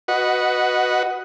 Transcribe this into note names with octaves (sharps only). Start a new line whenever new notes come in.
F#4 B4 D#5 F#5